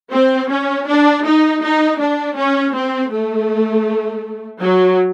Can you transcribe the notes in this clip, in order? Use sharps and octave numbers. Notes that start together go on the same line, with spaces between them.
C4
C#4
D4
D#4
D#4
D4
C#4
C4
A3
F#3